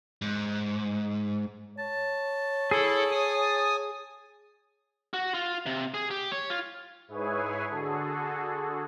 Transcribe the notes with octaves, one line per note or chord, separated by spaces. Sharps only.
G#2
C#5 A5
E4 G#4 A4
G#5 D#6
F#4
F4
C3
G#4
G4
C#5
F4
G#2 E4 G#4 B4 C#5 G#5
D3 F#4 G#4 A4